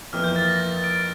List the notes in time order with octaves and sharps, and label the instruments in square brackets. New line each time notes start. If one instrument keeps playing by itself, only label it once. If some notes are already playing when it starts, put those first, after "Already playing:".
[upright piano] F2 E3 A#3 [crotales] F6
[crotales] G6
A6
A#6
A6
D7